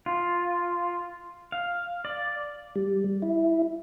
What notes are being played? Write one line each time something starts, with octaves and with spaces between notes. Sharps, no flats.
F4
F5
D5
G3
E4